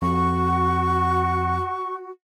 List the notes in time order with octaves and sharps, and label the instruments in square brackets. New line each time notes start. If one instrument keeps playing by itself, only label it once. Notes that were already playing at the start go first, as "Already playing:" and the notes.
[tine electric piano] F2 [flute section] F#4 [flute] C#6